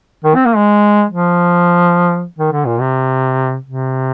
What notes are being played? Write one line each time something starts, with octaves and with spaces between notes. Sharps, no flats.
D#3
C4
A#3
G#3
F3
D#3
D3
A#2
C3
C3